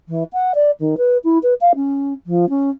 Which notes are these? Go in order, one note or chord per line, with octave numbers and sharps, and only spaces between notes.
E3
F#5
D5
D#3
B4
E4
B4
F5
C#4
F3
C#4